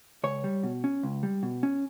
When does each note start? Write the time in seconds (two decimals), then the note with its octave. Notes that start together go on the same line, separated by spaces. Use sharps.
0.24 C#2 C#5
0.44 G3
0.63 B2
0.84 C#4
1.03 C#2
1.23 G3
1.43 B2
1.63 C#4